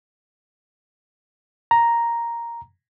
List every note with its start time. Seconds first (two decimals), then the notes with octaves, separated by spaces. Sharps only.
1.71 A#5